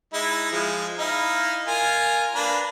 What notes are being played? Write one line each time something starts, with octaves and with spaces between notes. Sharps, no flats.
G#3 D#4 E4
F3 G#3
D#4 E4 F5
F4 A#4 G#5
A#3 D4 B4